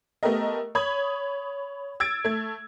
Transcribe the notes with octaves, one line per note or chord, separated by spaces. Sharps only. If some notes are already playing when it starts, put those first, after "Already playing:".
A3 B3 G4 A#4 D#5
C#5 B5 D#6 G#6
E6 G#6 A6 D7
A3 G#6